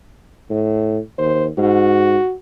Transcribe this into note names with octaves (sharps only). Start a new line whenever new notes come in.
A2
D#2 C5
G#2 F#4